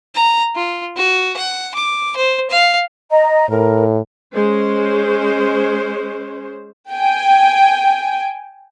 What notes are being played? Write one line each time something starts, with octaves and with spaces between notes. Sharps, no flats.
A#5
F4
F#4
F#5
D6
C5
F5
D#5 A#5
A2 A#4
G#3 C#4 C5
G5 G#5